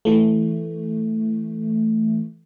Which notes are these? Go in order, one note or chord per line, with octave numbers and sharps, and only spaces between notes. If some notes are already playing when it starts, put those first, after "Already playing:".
E3 A3